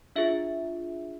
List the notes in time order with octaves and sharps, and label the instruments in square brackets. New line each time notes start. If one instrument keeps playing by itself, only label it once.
[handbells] D4 F4 G#4 E5